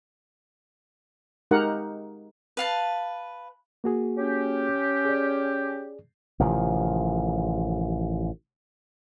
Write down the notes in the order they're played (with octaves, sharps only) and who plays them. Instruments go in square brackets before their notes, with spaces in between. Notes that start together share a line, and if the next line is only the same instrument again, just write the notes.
[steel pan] G#3 D#4 G4 A#4 F#5
[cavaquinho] B4 F5 A5
[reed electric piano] A#3 F#4 G#4
[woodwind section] C#4 G4
[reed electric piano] G#4 D5
[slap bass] A1 C3 D#3 F3